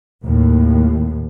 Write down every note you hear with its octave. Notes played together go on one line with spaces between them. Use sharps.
D#2 A2